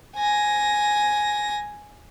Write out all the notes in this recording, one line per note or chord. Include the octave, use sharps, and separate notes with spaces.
G#5 A#6